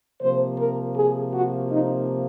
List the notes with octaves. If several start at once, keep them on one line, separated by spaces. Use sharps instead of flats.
C3 F3 A#3 C5
A#4
G#4
F#4
D#4